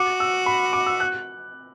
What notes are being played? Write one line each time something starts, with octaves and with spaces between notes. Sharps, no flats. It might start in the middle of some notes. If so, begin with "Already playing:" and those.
Already playing: F#4 D6
E6
B5
D6
E6
F#6